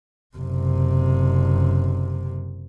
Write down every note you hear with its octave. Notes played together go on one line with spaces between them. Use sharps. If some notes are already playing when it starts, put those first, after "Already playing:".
F#1 C3